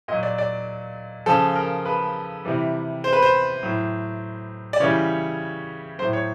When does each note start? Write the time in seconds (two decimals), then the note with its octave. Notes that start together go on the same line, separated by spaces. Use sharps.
0.08 A#2 D#5
0.12 F#3
0.23 D5
0.38 D5
1.26 C#3 F3 A4
1.55 A#4
1.85 B4
2.45 C3 E3 G3
3.04 C5
3.13 B4
3.22 C5
3.63 A2 F#3
4.73 D5
4.80 C#3 E3 G3 C#5
5.99 A2 F#3 C5
6.13 C#5